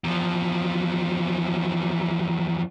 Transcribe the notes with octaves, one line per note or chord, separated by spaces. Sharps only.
E2 F3